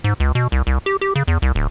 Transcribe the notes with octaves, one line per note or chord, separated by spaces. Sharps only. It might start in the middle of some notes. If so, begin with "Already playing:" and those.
G#2
C#2
B2
C2
C2
G4
G4
C#3
E2
C2
D1